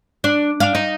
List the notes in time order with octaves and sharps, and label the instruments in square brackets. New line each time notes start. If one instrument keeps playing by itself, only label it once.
[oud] D4
D4 F5
D#4